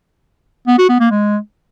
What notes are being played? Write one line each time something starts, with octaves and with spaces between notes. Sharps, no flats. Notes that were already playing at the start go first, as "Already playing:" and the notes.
B3
F#4
B3
A#3
G#3